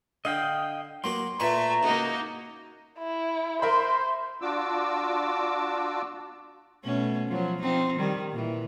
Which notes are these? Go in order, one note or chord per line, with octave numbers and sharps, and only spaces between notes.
D3 D#5 F5 G5
F#3 A#3 F#4 C6
A#2 A3 B4 E5 A#5 C#6
C#3 A#3 D#4 F#4
E4
A#4 C5 E5 B5
D4 F4 F#4 D6 E6
B2 A3 C#4
F3 F#3
F3 C4 D#4
D#3 G3
A#2 E3